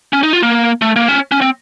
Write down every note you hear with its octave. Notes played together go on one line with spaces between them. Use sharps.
C#4
D#4
F4
A#3
A3
A#3
C#4
C#4
C4